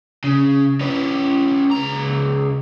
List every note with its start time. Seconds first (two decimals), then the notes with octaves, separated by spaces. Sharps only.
0.24 C#3
0.81 C#4 B4
1.71 C#2 A#5